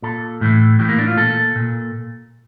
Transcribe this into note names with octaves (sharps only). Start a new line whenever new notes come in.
A#2 A4
A2 E3
A2 E3 G4
A#3
D4
F4
A#2 A4
A#2